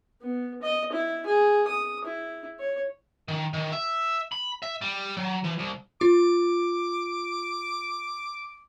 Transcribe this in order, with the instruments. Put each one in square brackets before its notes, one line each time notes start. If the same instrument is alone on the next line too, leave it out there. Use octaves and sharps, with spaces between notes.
[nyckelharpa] B3
D#5
E4
G#4
D#6
E4
C#5
[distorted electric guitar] D#3
D#3
E5
B5
E5
G3
F#3
E3
C2
[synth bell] F4 [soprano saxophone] D6